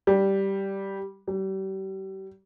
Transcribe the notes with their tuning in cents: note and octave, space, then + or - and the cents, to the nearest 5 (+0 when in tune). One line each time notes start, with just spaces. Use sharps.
G3 -5
G3 -35